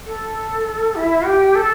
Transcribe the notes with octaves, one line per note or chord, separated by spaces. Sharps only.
A4
E4
G4
A4